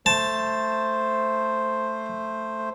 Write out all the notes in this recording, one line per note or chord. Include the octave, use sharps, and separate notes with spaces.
A3 C5 A5